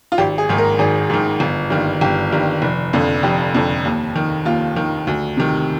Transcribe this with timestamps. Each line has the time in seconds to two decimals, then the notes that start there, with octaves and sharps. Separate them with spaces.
0.12 F4
0.18 G#1 G4
0.38 G#4
0.49 G#2 D#3
0.58 A#4
0.79 G#1 G#4
1.10 G#2 D#3
1.40 G1
1.70 G2 D#3
2.01 G1 G4
2.32 G2 D#3
2.62 F1
2.93 F2 D3
3.23 F1 G4
3.55 F2 D3
3.85 D#2
4.16 D#3
4.45 D#2 F4
4.76 D#3
5.07 D2
5.37 C3 D#3